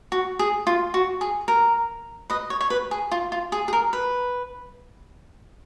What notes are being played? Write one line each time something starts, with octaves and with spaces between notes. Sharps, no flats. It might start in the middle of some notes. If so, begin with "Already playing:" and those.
F#4
G#4
F4
F#4
G#4
A#4
B4 D#5
C#5
C#5
B4
G#4
F4
F4
G#4
G#4
A#4
B4